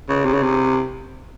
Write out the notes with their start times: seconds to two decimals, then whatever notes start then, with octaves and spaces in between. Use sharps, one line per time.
0.09 C#3
0.25 C3
0.34 C#3
0.43 C3